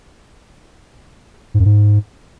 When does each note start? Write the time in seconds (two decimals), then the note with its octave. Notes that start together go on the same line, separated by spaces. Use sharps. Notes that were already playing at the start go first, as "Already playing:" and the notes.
1.54 G#2
1.60 F#2
1.65 G#2